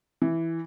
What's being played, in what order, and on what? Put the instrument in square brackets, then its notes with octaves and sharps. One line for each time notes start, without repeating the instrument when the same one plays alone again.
[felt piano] E3